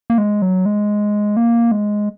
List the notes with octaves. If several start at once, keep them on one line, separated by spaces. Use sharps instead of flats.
A#3
G#3
F#3
G#3
A#3
G#3